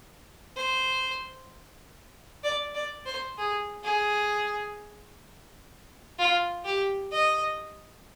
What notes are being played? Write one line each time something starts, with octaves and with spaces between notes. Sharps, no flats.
C5
D5
D5
C5
G#4
G#4
F4
G4
D#5